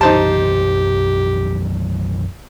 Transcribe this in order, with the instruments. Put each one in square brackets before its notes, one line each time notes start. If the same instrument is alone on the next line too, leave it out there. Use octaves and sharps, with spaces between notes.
[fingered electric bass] B1 F#2 E3 [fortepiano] D#4 C5 A5 [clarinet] G4